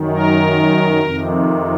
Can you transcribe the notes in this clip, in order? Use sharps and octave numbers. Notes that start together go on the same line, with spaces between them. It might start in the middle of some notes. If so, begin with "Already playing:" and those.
Already playing: F#2 D#3
A#4
F2 C3 D#3